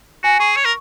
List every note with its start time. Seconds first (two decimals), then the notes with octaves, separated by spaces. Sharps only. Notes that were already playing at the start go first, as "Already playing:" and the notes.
0.23 F#4 G#5
0.40 G#4 C#6
0.56 C#5 C#6
0.65 A#4